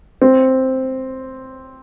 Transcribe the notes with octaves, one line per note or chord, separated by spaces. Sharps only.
C4